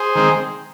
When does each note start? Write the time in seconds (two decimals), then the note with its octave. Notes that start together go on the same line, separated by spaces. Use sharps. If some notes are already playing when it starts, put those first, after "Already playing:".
Already playing: G#4 C5
0.15 D#3 G#3 C4